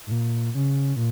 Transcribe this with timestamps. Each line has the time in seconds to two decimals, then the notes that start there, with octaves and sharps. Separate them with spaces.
0.07 G#2
0.11 A#2
0.55 C#3
0.96 A#2